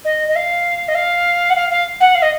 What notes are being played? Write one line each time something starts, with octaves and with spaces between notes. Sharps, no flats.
D#5
D#5
F5
D#5
F5
F#5
F5
F5
F#5
F5
D#5